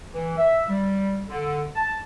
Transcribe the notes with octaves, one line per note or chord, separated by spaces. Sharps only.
E3
E5
G3
D3
A5